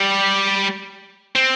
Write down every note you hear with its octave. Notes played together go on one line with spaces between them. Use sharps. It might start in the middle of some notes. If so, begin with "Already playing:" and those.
Already playing: G3
C4